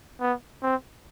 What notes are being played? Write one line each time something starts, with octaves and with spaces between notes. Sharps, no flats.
B3
C4